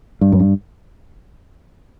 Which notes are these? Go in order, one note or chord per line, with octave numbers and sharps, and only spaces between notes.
G2
F#2
G2